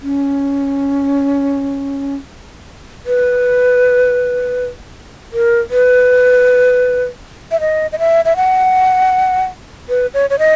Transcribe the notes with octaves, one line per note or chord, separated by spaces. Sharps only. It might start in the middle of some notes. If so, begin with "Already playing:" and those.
C#4
B4
A#4
B4
E5
D#5
D#5
E5
E5
F#5
B4
C#5
C#5
D#5